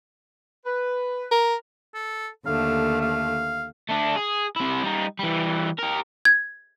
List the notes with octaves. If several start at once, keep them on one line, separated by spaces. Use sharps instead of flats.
B4
A#4
A4
D#2 D3 A3 F5
F5
A3 D4
G#4
C3 E4
G3 D#4
E3 G3
G4 A#4
G#6